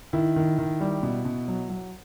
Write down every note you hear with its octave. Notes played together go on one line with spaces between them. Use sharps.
D#3 E4
D#3
D#3
G3
B2
B2
F#3
F#3